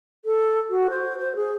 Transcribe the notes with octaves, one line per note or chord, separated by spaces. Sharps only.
A4
F#4
C5
C5
G#4